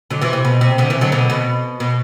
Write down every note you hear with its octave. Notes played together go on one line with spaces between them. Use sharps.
D3 F#3
C3 E3
C3
B2
C3
B2 D3
C3 E3
D3 F#3
B2 D3
B2
B2